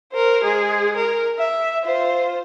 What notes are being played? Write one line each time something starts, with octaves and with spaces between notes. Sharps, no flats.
A#4 C5
G#3 G#4
A#4
E5
F4 C5